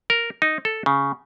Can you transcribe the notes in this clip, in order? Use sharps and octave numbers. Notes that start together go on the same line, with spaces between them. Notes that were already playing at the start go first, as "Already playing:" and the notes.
A#4
D#4
A4
C#3